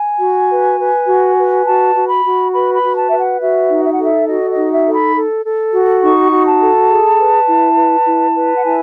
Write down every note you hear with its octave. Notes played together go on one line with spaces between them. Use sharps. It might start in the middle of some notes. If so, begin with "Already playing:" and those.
Already playing: G#5
F#4
B4
B4
F#4
B4
F#4 A5
F#4
B5
F#4
B4 B5
B5
F#4
A5
B4 E5
F#5
F#4 E5
D#4
E5
F#5
A4 E5
F#4 D#5
D#5
D#4
E5
A4
B5
A4
A4
F#4
D#4 C#6
F#4
A5
A4
G#4
B4
E4
B4
E4
B4
F#5
E4 G#5